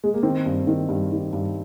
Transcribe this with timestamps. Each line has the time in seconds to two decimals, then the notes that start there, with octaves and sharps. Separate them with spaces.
0.04 G#3
0.14 A#3
0.23 D#3 C4
0.46 G2
0.67 D#3
0.89 G2
1.11 D#3
1.33 G2